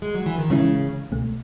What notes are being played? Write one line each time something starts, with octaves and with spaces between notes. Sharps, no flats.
G#3
F#3
E3
D#3
A2 C#3 E3 G#3 C#4 E4
C#2 B2 A3